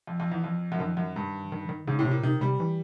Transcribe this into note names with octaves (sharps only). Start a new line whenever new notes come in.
F2
F2
E2
F2
F#2
F2 D#3
F#2
G2
D#3
D#3
G#2 C#3
A2
C3
A#2
C3 D#3
C3 G3
E3